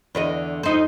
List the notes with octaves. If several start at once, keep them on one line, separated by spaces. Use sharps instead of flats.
E2 D3 D#5
F2 D#4 C5